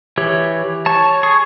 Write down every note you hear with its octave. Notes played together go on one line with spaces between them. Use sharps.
E3 G4 C#5
C#5 A5
G#4 C#6